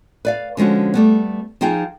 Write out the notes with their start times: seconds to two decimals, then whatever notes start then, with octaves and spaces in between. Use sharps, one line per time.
0.25 B4 D5 F5
0.57 D3 F3 G#3 C#4 F#4
0.94 G3 A3 B3
1.61 F3 D#4 F4 G#4 G5